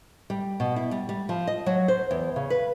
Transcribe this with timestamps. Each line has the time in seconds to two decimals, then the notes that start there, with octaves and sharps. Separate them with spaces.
0.30 G3
0.60 B2
0.76 E4
0.91 G3
1.09 G3
1.29 F3
1.47 D#5
1.66 F#3
1.88 C5
2.11 E2
2.36 C#3
2.50 B4